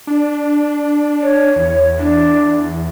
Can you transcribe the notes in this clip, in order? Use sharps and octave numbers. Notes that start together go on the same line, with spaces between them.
D4
C#5
E2
D4